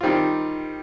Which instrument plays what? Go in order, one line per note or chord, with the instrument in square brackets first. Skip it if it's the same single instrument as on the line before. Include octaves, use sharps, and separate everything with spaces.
[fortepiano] D#3 G3 C4 F4